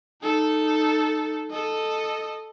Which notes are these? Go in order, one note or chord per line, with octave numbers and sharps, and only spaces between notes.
D#4 A4
A4 D#5